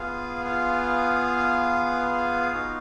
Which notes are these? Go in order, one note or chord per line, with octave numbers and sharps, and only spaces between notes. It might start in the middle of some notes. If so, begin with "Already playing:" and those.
Already playing: B3 F4 G#4 F5
F4 F5
B3 D#4 F#4